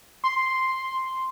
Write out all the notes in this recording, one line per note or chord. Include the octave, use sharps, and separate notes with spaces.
C6